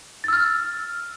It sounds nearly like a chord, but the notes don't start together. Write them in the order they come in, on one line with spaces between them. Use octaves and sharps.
A6 E6 F6